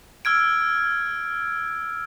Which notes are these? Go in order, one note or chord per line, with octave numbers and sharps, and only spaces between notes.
E6 F6 G#6 D7